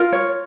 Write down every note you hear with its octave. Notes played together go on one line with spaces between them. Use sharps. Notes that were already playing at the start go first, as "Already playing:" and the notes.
Already playing: F4 A#4
C#5